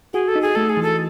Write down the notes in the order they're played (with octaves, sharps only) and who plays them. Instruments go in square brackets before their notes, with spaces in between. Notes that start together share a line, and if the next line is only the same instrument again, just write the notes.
[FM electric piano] F#4 [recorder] G#4
[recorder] A4
[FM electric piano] D#4
[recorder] G#4
[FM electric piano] A3 [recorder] A4
[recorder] G#4
[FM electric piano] E3
[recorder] A4